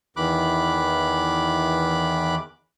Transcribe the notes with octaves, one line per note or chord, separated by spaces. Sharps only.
E2 D#3 E3 B5 D6 F#6